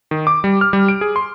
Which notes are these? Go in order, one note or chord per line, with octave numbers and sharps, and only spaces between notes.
D#3
D6
G3
F6
G3
D7
G#4
C6